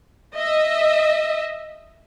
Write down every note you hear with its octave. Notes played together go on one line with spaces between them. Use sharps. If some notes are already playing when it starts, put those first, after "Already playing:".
D#5 E5